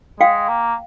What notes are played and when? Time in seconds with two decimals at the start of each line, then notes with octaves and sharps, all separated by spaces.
0.20 G#3 F5 G5
0.49 A#3